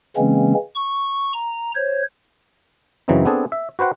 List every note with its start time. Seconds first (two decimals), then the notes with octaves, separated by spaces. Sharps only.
0.17 C#3 E3 G#3 A#3 C4 C#4
0.75 C#6
1.33 A#5
1.75 C5 C#5
3.08 F#2 C#3 E3 F#3 C4 D#4
3.25 B3 C4 D4 G#4 A4
3.52 E5
3.79 F#4 B4 C5 F#5 G5